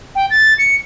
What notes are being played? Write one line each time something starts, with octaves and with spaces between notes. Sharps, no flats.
G5
A6
C#7